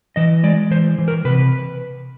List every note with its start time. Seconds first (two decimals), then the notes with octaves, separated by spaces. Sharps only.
0.16 E3 D#5
0.43 G#3 D5
0.71 E3 C5
0.98 E3
1.08 A#4
1.25 C3 B4